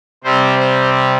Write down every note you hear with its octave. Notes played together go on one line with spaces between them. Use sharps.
C3 G3 C4 C5
C5